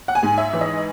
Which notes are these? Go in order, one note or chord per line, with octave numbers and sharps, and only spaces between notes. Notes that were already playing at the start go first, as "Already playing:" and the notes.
F#5
G#5
G#2
E5
E3
D#5